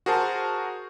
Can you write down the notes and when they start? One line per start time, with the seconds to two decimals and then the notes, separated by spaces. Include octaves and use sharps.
0.06 F#4 G#4 A#4 C5 A5